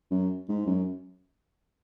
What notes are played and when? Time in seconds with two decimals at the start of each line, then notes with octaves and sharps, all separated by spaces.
0.11 F#2
0.49 G#2
0.66 F#2